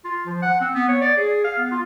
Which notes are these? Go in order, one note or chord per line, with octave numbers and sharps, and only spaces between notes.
F4
F3
F#5
C4
B3
C#5
D5
G#4
F5
B3
F4